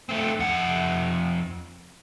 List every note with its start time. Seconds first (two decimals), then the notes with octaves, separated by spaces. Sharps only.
0.09 A3 C4
0.39 F2 F#5